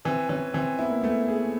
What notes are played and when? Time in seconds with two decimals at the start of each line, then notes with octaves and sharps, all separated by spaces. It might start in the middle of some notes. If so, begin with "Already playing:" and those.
0.05 E3 C4
0.29 E3 C#4
0.54 E3 C4
0.79 B3 E4
0.90 A#3
1.01 A3 B3
1.28 G#4